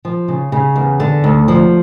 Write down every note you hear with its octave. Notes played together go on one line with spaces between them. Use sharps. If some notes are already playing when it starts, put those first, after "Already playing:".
F3
C#3
C#3
E2
D3
D2
F3